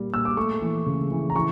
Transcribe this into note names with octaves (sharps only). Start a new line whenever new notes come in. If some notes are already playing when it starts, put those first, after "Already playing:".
Already playing: A#2 G3 A#3
A#2 E6
D6
A3 C#6
E3
C#3
E3
A#5
E3 C#6